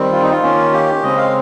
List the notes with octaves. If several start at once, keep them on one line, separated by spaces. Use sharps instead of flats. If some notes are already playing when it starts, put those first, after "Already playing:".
Already playing: D#3 G3 C4
F4
D#4
F4
D#3 A#3 C#4
G4
C#3 G#3 C4 D#5
F5